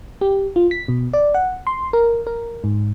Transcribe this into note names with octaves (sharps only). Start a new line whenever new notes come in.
G4
F4
B6
B2
D5
F#5
C6
A#4
A#4
G#2